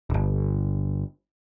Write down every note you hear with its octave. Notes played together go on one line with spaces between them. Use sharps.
D1 G1